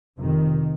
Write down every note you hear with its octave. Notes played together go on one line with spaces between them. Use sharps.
F1 F2 C3 D#3